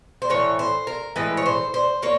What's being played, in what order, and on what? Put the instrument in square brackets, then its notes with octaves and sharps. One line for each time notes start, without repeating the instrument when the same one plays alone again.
[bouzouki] C5
A2 E3 C#5
C5
A#4
A2 E3 G#3 B4
C#5
C5
C5
A#3 C#5